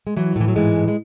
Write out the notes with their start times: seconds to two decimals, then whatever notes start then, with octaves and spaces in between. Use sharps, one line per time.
0.07 G#3
0.16 E3 F#3
0.36 A2 E3
0.48 F#3
0.56 G#2 E3 G#3
0.76 A2
0.88 G#3